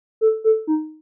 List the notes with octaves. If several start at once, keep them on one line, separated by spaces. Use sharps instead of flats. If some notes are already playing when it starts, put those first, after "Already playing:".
A4
A4
D#4